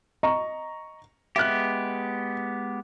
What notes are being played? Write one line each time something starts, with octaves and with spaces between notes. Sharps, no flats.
D#5 A#5 C#6
G#3 B3 G4 E5 F#6